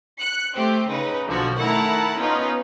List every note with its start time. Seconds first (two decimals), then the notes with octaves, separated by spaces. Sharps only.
0.21 F#6 C#7
0.55 A3 C4 G4
0.90 C#3 D#4 B4
1.28 B1 D3 F3 F#4
1.58 D#3 A3 E4 F#5 A5 A#5
2.18 B3 C#4 D#4 F4 B4